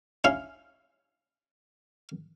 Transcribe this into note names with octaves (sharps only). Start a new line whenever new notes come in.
C#4 E4 F5